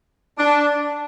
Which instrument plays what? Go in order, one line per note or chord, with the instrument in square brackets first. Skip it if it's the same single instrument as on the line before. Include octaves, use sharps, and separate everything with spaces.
[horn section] D4